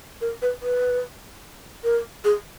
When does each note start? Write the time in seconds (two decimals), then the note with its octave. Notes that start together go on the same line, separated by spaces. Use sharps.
0.21 A#4
0.42 B4
0.62 B4
1.84 A#4
2.25 G#4